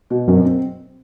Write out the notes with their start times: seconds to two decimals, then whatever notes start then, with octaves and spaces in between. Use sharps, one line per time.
0.10 B2
0.28 F#2 C4
0.45 C4